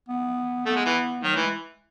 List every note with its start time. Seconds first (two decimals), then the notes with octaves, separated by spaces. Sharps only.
0.09 B3
0.66 A3 B3
0.76 G#3
0.86 E3
1.23 D#3 F#3
1.34 E3 A3
1.43 G#3